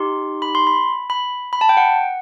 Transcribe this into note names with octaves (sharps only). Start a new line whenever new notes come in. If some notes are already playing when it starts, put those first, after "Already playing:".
Already playing: D#4 G4 C6
B5
C6
B5
B5
B5
A5
G5
F#5